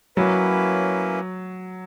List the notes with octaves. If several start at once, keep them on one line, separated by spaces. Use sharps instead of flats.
F#3 A#3 C#4 E4 B4